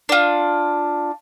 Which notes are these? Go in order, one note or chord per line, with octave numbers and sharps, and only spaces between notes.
D4 F4